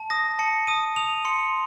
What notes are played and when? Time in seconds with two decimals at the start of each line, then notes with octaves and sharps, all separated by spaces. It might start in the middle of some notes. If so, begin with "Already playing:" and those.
Already playing: A5
0.10 D#6 A#6
0.39 A5 C#7
0.67 D#6 D#7
0.96 D#6 F7
1.25 C6 C#7